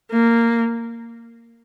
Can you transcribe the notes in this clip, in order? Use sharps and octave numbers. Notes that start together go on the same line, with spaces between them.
A#3